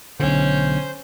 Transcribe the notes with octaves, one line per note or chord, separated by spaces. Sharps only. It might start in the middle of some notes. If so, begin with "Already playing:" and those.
B1 A2 D3 C#4 C5 G6